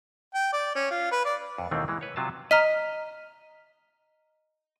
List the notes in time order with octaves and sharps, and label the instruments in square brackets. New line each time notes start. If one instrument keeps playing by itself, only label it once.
[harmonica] G5
D5
C#4
F4
B4
D5
[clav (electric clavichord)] F2
D#2 B2 D#3 E3 A3 C4
E3 G#3
B4 C#5
C3 F#3 F4 A5
[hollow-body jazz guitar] D#5 [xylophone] A#5 F6 B6